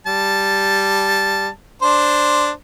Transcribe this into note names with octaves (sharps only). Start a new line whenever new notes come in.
G3 A5
D4 C5